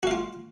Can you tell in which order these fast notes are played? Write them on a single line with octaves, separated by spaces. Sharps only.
F#4 F5 F4